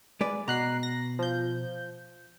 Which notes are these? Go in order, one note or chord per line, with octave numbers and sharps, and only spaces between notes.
G#3 B4 D5
B2 A#5 F#6 C7
A#6
F3 G6